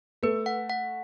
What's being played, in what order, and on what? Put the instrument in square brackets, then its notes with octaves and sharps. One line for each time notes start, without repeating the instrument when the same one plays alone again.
[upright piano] A3 [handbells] B4
[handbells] F#5
F#5